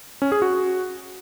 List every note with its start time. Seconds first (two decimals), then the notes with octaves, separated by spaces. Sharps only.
0.22 C#4
0.32 G#4
0.42 F#4